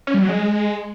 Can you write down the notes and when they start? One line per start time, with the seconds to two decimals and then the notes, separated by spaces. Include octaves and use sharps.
0.07 C#4
0.14 G3
0.21 F#3
0.29 G#3